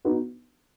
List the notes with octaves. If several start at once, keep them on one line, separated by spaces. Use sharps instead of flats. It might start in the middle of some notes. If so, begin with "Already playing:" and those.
B3 D#4 F#4 B4